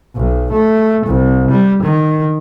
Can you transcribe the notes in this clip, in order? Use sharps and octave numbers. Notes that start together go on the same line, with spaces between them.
B1
A3
C2
G3
D#3